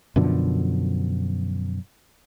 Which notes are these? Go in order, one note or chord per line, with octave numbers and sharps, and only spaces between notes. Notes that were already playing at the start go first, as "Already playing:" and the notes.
F#2 B2 D3 F3